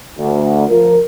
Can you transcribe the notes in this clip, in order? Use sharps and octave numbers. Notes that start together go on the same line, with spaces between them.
D2
F3 A#4